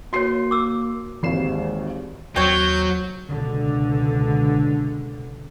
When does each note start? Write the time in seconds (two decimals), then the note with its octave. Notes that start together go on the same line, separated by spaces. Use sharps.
0.13 A#3 F#4 C#5 C6 C7
0.51 D6 E6
1.23 G#1 D#2 G#2 E3 C7 E7
2.36 D#2 F#3 C4 C#5 G6
3.26 C#2 B2 D3